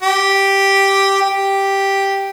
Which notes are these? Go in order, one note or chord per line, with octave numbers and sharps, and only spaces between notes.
G4
G4